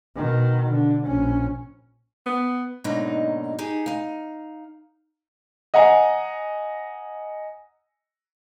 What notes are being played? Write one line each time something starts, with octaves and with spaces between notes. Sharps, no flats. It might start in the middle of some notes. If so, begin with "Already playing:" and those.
B2 D#3
D3
A#1 C#4
B3
G#2 B2 D3 F#3 A#3 D#4
D#4 G4 G#4
D#4 F5
D#5 F#5 G#5 A#5